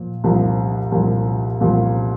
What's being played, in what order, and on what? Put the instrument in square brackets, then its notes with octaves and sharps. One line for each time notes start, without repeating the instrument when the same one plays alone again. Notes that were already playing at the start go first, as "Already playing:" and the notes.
Already playing: [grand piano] A#2 F3
C2 A#2 F3
C2 A#2 F3
C2 A#2 F3